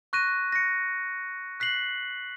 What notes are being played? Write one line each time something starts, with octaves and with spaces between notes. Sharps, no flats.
C#6 F#6 A#6 D#7
A#6 C#7
F#6 B6 C7 F#7